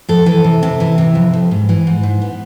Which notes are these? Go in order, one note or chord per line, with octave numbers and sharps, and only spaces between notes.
F2 A4
E3
C3
C3
E3
C3
F2
F2
G#2
E3
G#2
G#2
B3